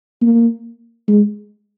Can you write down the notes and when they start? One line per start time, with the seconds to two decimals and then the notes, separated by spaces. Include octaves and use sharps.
0.21 A#3
1.08 G#3